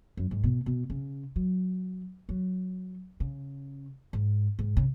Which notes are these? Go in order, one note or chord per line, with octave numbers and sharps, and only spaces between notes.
F#2
G#2
B2
B2
C#3
F#3
F#3
C#3
G#2
G#2
C#3